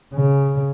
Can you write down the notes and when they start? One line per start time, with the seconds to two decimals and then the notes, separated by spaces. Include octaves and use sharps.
0.14 C#3